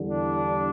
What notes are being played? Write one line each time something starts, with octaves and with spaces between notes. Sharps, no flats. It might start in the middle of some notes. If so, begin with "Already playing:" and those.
Already playing: E2 D3 G3
D4